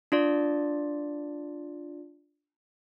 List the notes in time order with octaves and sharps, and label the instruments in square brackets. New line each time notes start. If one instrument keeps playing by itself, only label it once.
[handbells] D4 F4 D5